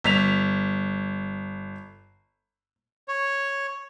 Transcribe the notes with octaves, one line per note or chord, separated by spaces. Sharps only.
G1 B6 F7
C#5